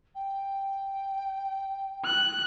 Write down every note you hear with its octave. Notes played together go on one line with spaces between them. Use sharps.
G5
F#6